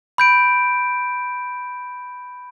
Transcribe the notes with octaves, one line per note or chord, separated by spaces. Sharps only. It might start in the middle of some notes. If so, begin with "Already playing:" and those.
B5 G6 D7